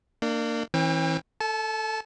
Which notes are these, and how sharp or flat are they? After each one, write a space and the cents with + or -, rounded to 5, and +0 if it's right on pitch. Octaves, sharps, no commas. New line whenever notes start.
A#3 -15 D4 +35
E3 -20 C4 +45 G5 +35
A4 +10 A5 -30